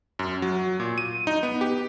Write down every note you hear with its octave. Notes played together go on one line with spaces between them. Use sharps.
F#2
F#3
A#2
D#7
D#4
B3
G4